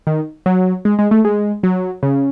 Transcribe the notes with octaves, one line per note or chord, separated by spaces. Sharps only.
D#3
F#3
G#3
G#3
A3
G#3
F#3
C#3